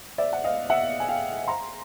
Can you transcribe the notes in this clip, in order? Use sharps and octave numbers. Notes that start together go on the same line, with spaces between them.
D5 E5
F#5
D#5 F5
E5 F#5
G#5
F5 G5
A#5 C6